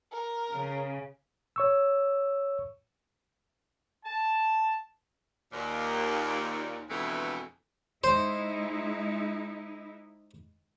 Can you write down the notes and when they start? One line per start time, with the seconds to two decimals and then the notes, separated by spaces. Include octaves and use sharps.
0.12 A#4
0.53 C#3
1.56 C#5 C#6 E6
4.04 A5
5.53 D#2 A#2
6.90 F2 B2 D3 E3 G#3 A3
8.04 G#3 D#4 E4 C5